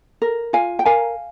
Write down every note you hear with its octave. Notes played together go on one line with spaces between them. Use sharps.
A#4
F4 F5 G#5
G5
A#4 F5 G#5